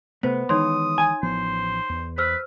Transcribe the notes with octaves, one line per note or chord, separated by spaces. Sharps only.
C3 A3 B3 C5
D#3 E3 G#3 D#4 C#5 C6 D#6
G#5
A1 F3 B3 C5
E2
B4 C5 E6 F6